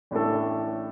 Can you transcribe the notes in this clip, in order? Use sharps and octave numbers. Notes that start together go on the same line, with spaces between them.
A1 A2 A3 D4 A4